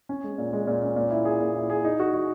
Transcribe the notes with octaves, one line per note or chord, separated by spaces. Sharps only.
C#4
G#3
A#2
G#3
A#2
C#4
A#2
E4
G#4
A#2
E4
G#4
D#4
F#4
F#4